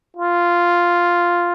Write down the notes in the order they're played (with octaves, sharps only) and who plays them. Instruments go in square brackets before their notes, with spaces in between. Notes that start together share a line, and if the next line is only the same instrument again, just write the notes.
[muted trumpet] F4